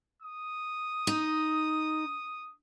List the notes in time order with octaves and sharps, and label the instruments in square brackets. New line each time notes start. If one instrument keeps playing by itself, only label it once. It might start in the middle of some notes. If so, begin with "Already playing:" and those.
[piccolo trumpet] D#6
[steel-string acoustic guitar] D#4